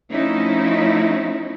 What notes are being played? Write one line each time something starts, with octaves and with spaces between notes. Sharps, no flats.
F3 A3 C4 C#4 D#4 E4